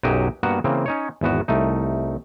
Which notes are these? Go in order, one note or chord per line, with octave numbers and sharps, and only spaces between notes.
B1 F#2 F#3 F#4 G4 D#5
G2 A#3 B3 F#4 F#5 A#5
C#3 E3 A#3 C4
C#4 D#4 C#5
G#1 E2 B3 F#4
C2 A3 D#4